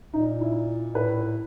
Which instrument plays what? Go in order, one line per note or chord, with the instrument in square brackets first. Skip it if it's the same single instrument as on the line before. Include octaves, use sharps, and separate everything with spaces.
[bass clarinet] A#2 [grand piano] D#4
[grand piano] E4
[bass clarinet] A2 [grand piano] B4